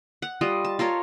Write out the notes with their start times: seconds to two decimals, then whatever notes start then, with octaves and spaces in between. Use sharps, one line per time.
0.22 F#5
0.41 G3 F4 D#5
0.64 A5
0.79 F4 A4 A#4 C#5